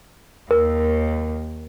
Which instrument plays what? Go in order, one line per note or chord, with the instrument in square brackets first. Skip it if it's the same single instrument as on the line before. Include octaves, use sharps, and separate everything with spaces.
[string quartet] D#2 [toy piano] A#4